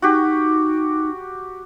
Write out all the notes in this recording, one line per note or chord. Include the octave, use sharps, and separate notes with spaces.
D#4 F#4 G4